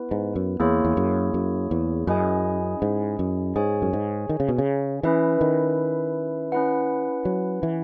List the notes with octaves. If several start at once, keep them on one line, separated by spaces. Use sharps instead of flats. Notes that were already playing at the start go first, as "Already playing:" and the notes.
Already playing: B3 E4 B4
G#2
F#2
E2 A#3 E4 G#4 C#5
E2
F#2
F#2
E2
F#2 C#4 E4 G#4 D#5 G#5
G#2
F#2
G#2 G#4 C#5 G#5
F#2
G#2
D#3
C#3
B2
C#3
E3 C#4 E4 B4 E5
D#3
C#4 E4 B4 F#5
F#3
E3